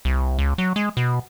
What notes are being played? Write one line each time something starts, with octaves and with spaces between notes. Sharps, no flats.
C2
C#2
F#3
G#3
B2